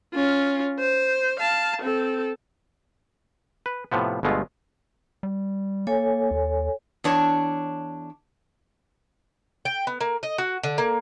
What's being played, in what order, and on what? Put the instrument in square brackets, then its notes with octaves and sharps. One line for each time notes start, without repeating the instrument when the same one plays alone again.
[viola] C#4 F4
C5
F5 A5
C4 A4
[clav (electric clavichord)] B4
A2 C3 F3 B3
G1 B2 G#3 A3 F4
[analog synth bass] G3
[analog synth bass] A#3 [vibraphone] A4 C#5 G#5
[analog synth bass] D#2
[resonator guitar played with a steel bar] E2 D4 C#5
[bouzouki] G5
B3
A#3
D#5
F#4
D3
A#3